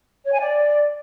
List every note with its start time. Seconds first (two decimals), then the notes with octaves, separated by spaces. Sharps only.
0.24 C#5
0.32 G#5
0.40 D5